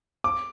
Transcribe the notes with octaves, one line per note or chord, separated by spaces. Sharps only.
D6